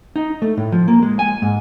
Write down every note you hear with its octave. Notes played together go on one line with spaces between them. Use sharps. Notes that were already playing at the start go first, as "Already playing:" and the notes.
D#4
A3
A2
F3
A#3
G#3
G#5
G#2